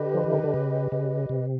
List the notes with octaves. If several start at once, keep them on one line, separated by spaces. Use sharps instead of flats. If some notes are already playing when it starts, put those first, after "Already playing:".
Already playing: D3 G4 B4 D#5
F3
E3
D#3
D3
C#3
C#3
C3